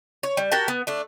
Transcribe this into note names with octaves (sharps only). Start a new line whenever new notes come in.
C#5
G3
F#4 G4 A#4 A5
B3
A3 D4